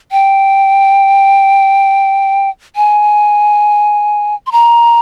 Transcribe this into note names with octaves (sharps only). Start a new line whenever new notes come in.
G5
G#5
C6
A#5